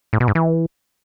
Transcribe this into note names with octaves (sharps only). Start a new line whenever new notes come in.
A2
B2
G#2
E3